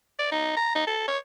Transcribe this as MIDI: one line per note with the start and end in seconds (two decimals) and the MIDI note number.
0.19 0.29 74
0.32 0.53 63
0.57 0.71 82
0.75 0.86 63
0.87 1.04 69
1.08 1.18 73